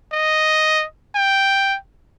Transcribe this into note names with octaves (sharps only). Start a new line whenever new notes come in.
D#5
G5